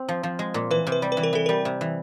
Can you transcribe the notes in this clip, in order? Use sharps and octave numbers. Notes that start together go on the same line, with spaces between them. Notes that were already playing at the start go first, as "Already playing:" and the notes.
Already playing: C4
F3
F3
G#3
A#2
E3 B4
C3
B4
G3
B4
E3
A#4
E3 A4
G3 A#4
C3
E3